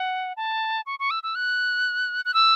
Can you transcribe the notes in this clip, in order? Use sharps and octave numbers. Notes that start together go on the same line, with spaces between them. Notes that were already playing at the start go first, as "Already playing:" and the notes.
Already playing: F#5
A5
C#6
C#6
E6
E6
F#6
F#6
E6